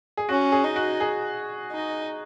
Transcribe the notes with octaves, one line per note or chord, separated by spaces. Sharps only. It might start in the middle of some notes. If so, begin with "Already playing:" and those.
G#4
C#4 F#4
G#4
D#4
F#4
G#4
D#4